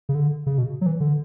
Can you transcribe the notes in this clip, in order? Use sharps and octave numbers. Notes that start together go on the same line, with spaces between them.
C#3
D3
C#3
B2
F#3
E3
D3